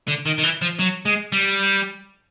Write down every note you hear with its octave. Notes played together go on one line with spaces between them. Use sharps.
D3
D#3
D#3
E3
F3
F#3
G#3
G3